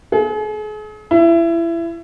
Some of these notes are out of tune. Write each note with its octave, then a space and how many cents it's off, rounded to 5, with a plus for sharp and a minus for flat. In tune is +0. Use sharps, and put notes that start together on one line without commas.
G#4 +40
E4 +25